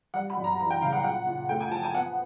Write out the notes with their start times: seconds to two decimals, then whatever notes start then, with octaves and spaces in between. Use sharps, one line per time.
0.14 G3 F#5
0.30 B5
0.37 F#2
0.44 A#5
0.59 E3 A#5
0.70 G5
0.82 C#3 F5
0.93 F#5
1.04 A#2 F#5
1.27 A#2
1.49 A3 G5
1.60 G#5
1.71 F3 A5
1.83 G#5
1.94 B3 F#5